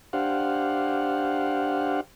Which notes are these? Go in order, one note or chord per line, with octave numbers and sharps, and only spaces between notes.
D4 G4 C5 F5 F#5